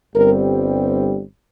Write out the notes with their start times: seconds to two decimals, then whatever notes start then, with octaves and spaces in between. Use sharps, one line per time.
0.14 G1 G2 G3 C4 A#4